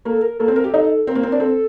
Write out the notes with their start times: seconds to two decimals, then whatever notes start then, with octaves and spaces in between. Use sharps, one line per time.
0.05 A#3 A4
0.22 A#4
0.39 A#3 A4
0.48 C4
0.56 A#4
0.64 G4
0.74 D#4
1.07 C4 A#4
1.15 A#3
1.23 C4 A#4
1.32 D4
1.40 C4 A4